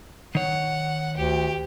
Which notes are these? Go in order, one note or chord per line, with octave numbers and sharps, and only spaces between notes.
D#3 C#5 F#5
D2 G4